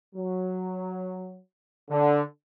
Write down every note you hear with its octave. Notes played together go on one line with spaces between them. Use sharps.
F#3
D3